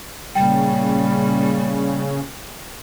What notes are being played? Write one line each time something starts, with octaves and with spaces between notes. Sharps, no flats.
A#2 C#3 G3 A#3 G5